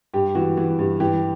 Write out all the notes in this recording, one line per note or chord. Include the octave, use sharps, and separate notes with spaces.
G2 G4
E3 F#4
E3
G2
E3 G4